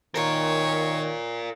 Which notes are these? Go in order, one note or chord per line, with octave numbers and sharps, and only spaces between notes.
D#3 F4 A#4 C#5